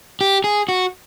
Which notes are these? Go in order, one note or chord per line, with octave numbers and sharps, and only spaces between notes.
G4
G#4
F#4